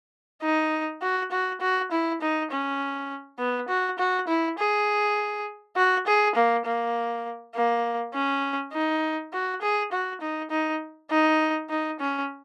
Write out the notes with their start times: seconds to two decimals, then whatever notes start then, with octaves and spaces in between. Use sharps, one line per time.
0.42 D#4
1.02 F#4
1.31 F#4
1.61 F#4
1.91 E4
2.21 D#4
2.51 C#4
3.39 B3
3.68 F#4
3.99 F#4
4.28 E4
4.58 G#4
5.76 F#4
6.07 G#4
6.35 A#3
6.65 A#3
7.55 A#3
8.14 C#4
8.73 D#4
9.33 F#4
9.62 G#4
9.92 F#4
10.21 D#4
10.51 D#4
11.10 D#4
11.70 D#4
12.00 C#4